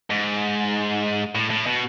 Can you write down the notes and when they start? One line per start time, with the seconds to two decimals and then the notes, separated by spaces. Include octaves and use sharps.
0.10 G#2
1.35 A2
1.50 A2
1.66 B2